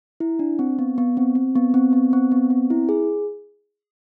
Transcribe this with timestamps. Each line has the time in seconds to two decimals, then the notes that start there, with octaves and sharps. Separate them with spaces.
0.20 E4
0.39 D4
0.59 C4
0.79 B3
0.98 B3
1.17 C4
1.35 C4
1.56 B3
1.74 C4
1.93 B3
2.13 C4
2.32 B3
2.50 C4
2.70 E4
2.89 G#4